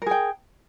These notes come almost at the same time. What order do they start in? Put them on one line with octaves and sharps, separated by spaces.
A#4 G#4 G5